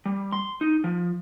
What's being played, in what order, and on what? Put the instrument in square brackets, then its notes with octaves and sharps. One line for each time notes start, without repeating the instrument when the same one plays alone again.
[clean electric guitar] G3
C6
D#4
F3